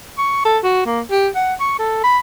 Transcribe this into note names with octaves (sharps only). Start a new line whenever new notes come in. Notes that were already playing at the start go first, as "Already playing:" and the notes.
C#6
A4
F#4
A#3
G4
F#5
C#6
A4
B5